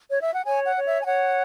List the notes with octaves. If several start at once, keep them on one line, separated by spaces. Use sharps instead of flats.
C#5
E5
F#5
C#5 G#5
F#5
C#5
E5
G#5
C#5 F#5